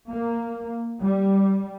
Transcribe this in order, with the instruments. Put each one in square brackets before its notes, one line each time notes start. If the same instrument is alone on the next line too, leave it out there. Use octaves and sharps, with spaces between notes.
[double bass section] A#3
G3